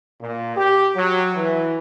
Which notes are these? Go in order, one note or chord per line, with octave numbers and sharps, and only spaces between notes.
A#2
G4
F#3
E3